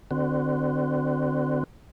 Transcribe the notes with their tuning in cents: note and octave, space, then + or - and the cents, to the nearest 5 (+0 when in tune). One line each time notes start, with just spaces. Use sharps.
D3 +20 C4 -25 F#4 +5